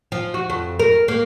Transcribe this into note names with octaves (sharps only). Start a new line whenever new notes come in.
F3
F#4
F2
A#4
A#3